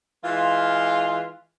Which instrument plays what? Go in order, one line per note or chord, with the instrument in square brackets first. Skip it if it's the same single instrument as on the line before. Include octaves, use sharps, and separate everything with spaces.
[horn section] E3 G#3 F4